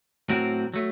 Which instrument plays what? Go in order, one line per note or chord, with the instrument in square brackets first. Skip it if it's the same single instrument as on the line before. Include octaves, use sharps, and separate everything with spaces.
[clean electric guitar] A2 F#3 C4 F#4 A#4
F#3 A3